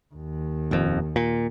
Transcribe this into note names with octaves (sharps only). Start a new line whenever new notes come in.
D#2
D#1 F2
A#2